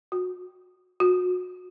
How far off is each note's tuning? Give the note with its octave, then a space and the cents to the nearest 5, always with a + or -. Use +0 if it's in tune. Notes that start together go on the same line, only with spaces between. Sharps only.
F#4 -25
F#4 -30